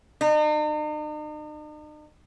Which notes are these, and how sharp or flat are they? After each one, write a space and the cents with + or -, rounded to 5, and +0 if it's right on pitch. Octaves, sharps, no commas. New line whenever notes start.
D#4 -45